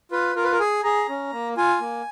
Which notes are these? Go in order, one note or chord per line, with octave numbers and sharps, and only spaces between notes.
F4 B4
F4 A#4
B4
A#4
G#4 G#5
G#4 A#5
C#4
A#3
F4 G#5
A#3